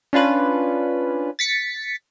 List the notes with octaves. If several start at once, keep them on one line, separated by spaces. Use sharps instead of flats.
C#4 D4 F4 B4
A6 B6 C#7